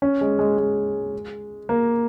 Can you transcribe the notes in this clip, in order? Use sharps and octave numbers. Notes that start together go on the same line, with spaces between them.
C#4
G#3
G#3
G#3
A#3